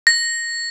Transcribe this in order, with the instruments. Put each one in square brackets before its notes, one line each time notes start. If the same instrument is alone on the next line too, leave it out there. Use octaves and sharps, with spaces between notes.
[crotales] A#6